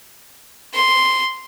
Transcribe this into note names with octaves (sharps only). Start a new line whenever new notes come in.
C6